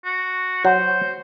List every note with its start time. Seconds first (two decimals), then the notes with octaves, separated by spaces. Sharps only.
0.05 F#4
0.65 F#3 C5